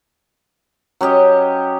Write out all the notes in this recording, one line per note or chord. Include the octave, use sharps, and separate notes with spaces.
F#3 C#4 G4 D#5